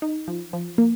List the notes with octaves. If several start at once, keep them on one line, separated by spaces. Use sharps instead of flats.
D#4
F3
F3
A#3